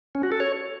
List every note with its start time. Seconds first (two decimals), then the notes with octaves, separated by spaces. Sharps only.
0.15 C#4
0.23 F#4
0.32 A4
0.40 C#5